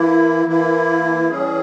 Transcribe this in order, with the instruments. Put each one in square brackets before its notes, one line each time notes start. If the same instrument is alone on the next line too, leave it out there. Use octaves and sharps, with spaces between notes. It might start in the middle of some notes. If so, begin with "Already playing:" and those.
Already playing: [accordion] E3 A#3 E4
E3 A#3 E4
E3 G3 C#4 G#4